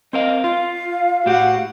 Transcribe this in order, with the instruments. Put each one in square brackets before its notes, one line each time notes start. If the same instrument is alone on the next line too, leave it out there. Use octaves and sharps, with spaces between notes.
[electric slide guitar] C4 A#4 F5 [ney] D#5
[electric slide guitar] F4 [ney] F5
[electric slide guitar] A2 G4 [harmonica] F#4